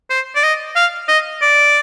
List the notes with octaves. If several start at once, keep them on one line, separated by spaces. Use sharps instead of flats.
C5
D5
D#5
F5
D#5
D5